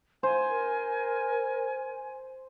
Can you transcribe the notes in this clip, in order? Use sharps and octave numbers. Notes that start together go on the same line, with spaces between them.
C5 G#5
A#4